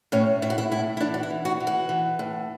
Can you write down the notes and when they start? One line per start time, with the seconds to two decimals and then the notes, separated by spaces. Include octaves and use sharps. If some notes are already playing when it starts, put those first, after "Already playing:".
0.12 A2 C#4
0.42 A2 E4
0.50 F#4
0.58 E4
0.71 A2 E4
0.97 E4
1.00 E3 D4
1.14 F#4
1.23 E4
1.30 E3
1.45 F#4
1.60 E3
1.67 F#4
1.89 E3
2.19 A2